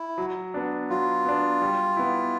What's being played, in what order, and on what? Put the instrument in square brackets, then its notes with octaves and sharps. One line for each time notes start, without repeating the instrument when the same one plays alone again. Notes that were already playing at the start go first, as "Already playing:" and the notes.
Already playing: [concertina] E4
[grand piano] F#3
B3 D4
[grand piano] F#3 [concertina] F4
[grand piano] B3 D4
G3
B3 E4